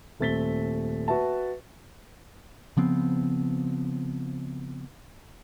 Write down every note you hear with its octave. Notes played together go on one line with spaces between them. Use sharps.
D#1 A3 C4 A6 B6 G7
F#4 B4 E5 A5
C#3 F3 B3 C4